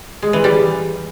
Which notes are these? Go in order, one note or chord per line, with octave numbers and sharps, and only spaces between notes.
G#3
E3
G3